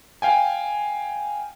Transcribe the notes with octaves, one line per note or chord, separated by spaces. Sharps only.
F5 G5 G#5